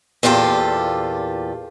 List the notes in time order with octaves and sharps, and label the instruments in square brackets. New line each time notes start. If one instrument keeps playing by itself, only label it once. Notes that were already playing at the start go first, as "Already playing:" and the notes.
[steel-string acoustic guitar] E2 A#2 F4 G4 A4